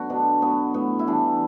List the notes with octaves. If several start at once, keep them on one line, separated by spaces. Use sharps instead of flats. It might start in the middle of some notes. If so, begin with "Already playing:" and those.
Already playing: D3 F#3 B3 F#4
B2 D4
F#3 B3
A2 B3
E4
E3 G3 D4